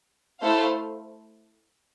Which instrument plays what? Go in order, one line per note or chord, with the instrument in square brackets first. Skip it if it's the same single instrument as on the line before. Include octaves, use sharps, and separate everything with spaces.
[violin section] A3 E4 A4 C5 F5